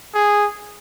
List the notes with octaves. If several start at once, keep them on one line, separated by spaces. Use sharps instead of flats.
G#4